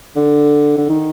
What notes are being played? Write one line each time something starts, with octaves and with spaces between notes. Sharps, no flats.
D3
D3
D#3